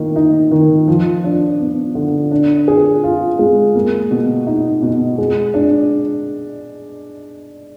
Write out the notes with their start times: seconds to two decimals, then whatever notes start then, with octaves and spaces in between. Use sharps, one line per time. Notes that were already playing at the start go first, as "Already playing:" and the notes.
Already playing: D#3 A#3
0.16 D#4
0.51 D#3
0.88 F3
1.24 D4
1.60 B3
1.95 D3
2.31 D4
2.68 G#4
3.04 F4
3.39 G#3
3.75 A#3
4.11 B2
4.47 D#4
4.82 B2
5.18 G#3
5.54 D4